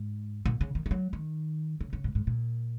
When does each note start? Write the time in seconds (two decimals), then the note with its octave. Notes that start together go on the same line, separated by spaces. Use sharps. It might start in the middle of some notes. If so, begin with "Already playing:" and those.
Already playing: G#2
0.46 A#2
0.61 C#3
0.75 D#3
0.86 D#3
0.91 F#3
1.13 D#3
1.81 C#3
1.93 C#3
2.04 G#2
2.15 G#2
2.27 A#2